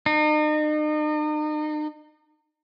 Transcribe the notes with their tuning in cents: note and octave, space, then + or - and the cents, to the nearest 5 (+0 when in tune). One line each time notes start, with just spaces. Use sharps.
D#4 -40